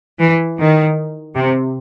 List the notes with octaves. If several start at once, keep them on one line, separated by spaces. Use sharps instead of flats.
E3
D#3
C3